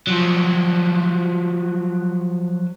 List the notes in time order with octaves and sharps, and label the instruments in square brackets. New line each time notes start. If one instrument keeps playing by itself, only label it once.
[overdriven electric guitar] F3 F#3